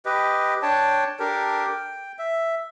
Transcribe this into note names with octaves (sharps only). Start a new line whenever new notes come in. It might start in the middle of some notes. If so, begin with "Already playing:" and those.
G4 B4 D#5
D4 C#5 G5 A5
D4 G4 A4 A#4
G5
E5